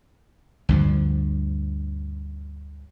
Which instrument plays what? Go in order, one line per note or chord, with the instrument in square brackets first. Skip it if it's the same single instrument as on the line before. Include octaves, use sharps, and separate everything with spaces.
[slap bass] D2 G2 F3